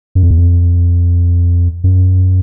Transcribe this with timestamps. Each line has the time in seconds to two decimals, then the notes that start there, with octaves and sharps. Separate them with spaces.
0.15 F#2
0.23 F2
0.31 E2
0.38 F2
1.84 F#2